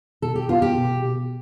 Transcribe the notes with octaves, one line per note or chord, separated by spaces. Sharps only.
B2 A4
G4
B3 F4
G4
B2
B2